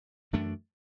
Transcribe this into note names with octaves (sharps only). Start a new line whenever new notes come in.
F#2 E3 A3 D4